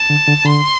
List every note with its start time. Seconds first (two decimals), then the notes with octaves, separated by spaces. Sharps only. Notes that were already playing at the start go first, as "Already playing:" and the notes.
Already playing: A5
0.10 D3
0.28 D3
0.45 D3 C6